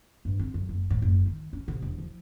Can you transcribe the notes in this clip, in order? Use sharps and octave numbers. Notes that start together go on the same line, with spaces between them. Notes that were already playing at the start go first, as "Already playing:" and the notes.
G2
C4
F#2
F#1
G#2
F#1
D#3
C#4
C3
E1
F3